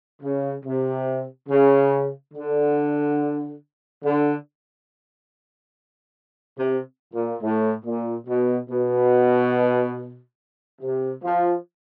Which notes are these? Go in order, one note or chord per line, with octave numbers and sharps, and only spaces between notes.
C#3
C3
C#3
D3
D3
C3
A#2
A2
A#2
B2
B2
C3
F3